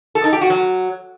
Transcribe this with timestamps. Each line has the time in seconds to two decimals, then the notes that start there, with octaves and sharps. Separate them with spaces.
0.15 A4
0.24 D#4
0.33 G4
0.41 F#4
0.50 F#3